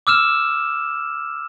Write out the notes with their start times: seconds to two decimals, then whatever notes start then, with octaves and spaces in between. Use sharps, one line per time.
0.07 D6 E6 F6 E7